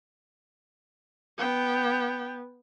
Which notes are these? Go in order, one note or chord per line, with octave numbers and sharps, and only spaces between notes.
B3 G5